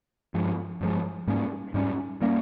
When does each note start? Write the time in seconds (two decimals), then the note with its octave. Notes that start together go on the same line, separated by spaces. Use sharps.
0.34 G2 F3 G#3
0.81 G2 F3 G#3
1.27 G#2 G3 A#3 C#4
1.74 G#2 G3 A#3 C#4
2.22 G3 A#3 C#4